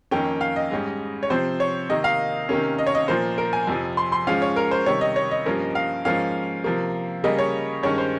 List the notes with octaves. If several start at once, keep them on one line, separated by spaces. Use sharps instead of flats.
F2 D#3 A#3 C#4 G5
F5
D#5
G#2 G3 C#4
C#5
C3 F3 C4 C5
C#5
C3 D#3 A#3 D#5
F5
C3 D#3 A#3 C#4
D#5
C#5
D#5
A#2 F3 A#3 C5
A#4
G#5
F2 C3 F3
C6
C6
G#2 F3 G#3 C#4 F5
C#5
A#4
C5
C3 D#3 G3 C#5
D#5
C#5
D#5
G2 F3 A#3 C#4
F5
G#2 F3 A#3 C#4 F5
C3 F3 A#3
C#3 G3 A#3 C#4 D#5
C#5
G2 D#3 G#3 C#4 C#5
C5